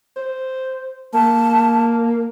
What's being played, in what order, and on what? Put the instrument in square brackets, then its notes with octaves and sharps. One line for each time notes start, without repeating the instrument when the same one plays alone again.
[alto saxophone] C5
[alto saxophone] A#3 [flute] A5